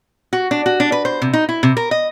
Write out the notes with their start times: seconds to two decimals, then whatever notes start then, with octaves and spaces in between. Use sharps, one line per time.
0.33 F#4
0.51 D4
0.66 F#4
0.80 D4
0.92 B4
1.05 C5
1.22 C3
1.33 D#4
1.49 E4
1.63 C3
1.77 A#4
1.91 D#5